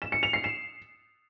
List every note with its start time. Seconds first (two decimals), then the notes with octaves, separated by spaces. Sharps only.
0.02 E7
0.12 C#7
0.23 F7
0.33 C7
0.44 E7